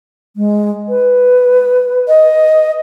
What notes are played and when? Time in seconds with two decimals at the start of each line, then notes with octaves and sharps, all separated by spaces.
0.36 G#3
0.89 B4
2.08 D#5